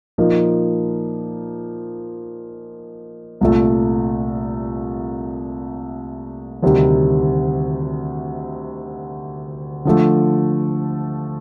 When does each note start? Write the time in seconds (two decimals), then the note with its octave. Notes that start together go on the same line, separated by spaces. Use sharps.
0.18 A#2 F3 A#3 D#4
3.41 C2 A#2 A3
6.63 D2 C3 D#3 G3
9.85 D3 F3 A3